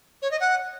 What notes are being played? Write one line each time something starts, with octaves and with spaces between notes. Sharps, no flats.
C#5
D#5
F#5